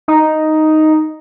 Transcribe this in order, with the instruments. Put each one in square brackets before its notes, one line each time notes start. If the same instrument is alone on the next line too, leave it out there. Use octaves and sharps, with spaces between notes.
[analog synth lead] D#4